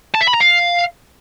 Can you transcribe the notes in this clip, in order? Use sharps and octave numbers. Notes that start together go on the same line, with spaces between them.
A5
E5
B5
A#5
F5